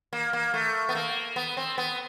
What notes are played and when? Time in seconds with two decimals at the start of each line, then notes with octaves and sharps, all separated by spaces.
0.13 A#3
0.33 A#3
0.54 A3
0.89 B3
0.95 A#3
1.36 B3
1.57 C4
1.78 B3